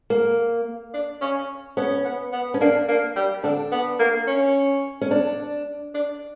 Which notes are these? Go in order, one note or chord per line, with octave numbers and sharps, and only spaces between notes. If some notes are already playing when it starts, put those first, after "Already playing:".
A#3
D4
C#4
B3 C#4
B3
B3
C#4
A#3 D4
A#3
G3
D3 D4
B3
A#3
C#4
C#4
D4
D4